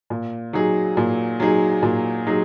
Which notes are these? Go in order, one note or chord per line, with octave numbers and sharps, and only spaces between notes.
A#2
F#3 D#4 G#4
A#2
F#3 D#4 G#4
A#2
F#3 D#4 G#4